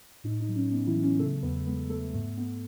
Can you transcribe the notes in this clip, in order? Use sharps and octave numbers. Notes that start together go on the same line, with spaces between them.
A2 D#4
D#4
F#3
C#4
B3 D#4
E3 E4
F#3
C#4
C#3 A3 A4
E2 B3 B4
G#3 B3 B4
A3 B3 A4
G#2 A3 A4
B3